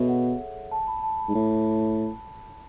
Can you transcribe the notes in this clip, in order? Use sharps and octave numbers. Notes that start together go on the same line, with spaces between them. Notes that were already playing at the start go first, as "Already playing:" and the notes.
Already playing: B2 G#4 A4 C#5 E5
F#5
A5
B5
A5
B5
G#2
A2